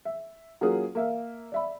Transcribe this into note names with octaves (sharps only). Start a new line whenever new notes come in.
E5
F#3 A#3 C#4 F4 F#4 G#4
A#3 E5 F5
D5 E5 B5